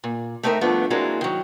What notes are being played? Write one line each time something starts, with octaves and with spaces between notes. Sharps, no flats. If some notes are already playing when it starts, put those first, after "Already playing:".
A#2
A3 C4 D#4 A4 A#4 E5
G2 F3 A3 B3 D4
E3 F#3 G#3 A#3 C4 D4
D#3 F#3